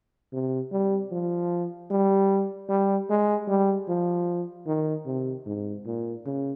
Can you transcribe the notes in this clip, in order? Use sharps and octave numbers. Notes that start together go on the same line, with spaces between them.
C3
G3
F3
G3
G3
G#3
G3
F3
D#3
C3
G#2
A#2
C#3